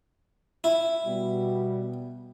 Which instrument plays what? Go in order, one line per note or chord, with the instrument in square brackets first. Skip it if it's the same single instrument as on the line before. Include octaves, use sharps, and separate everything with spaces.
[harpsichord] E4
[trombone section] B2 G3